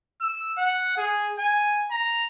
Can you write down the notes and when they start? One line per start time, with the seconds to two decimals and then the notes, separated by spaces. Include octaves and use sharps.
0.21 E6
0.58 F#5
0.97 G#4
1.39 G#5
1.91 A#5